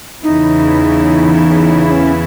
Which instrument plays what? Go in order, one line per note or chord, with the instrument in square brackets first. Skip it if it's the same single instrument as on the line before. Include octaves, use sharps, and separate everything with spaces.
[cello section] E2 C#3 E3 B3 E4 [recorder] D#4
[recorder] D#4
C#4